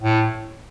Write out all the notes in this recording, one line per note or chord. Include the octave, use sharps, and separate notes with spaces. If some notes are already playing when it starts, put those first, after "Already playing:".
A2